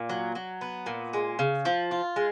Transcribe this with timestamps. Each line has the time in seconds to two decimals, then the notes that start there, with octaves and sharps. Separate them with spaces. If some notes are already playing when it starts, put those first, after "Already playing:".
Already playing: A#2
0.09 F#3
0.35 F#3
0.61 B3
0.86 A#2
1.13 G#3
1.39 C#3
1.65 F3
1.91 F4
2.16 G#3